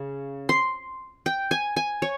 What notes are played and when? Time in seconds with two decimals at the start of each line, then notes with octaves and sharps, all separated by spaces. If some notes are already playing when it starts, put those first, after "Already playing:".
Already playing: C#3
0.49 C6
1.26 G5
1.51 G#5
1.76 G#5
2.02 C#5